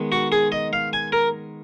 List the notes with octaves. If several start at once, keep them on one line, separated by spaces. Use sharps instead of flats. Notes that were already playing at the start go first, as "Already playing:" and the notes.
Already playing: D#3 G#3 B3
F#4
G#4
D#5
F5
G#5
A#4